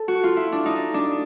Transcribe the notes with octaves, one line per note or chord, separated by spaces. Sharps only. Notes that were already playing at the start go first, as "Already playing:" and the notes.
Already playing: A4
F#4
F4
E4
D4
D#4
D4